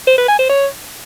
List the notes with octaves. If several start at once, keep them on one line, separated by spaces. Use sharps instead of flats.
C5
B4
G#5
C5
C#5